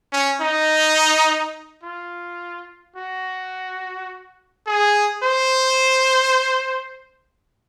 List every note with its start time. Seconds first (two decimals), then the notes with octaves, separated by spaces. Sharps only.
0.12 C#4
0.41 D#4
1.83 F4
2.96 F#4
4.67 G#4
5.23 C5